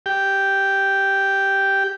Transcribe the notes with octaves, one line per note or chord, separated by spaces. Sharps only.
G4 G5